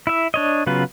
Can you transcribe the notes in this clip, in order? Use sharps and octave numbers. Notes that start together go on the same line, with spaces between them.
E4 E5
D4 C#5 D#5
C#3 F#3 B3 F4 B4